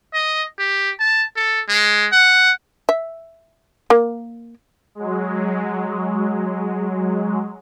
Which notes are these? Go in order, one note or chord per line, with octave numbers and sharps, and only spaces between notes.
D#5
G4
A5
A4
G#3
F#5
E5
A#3
F#3 G#3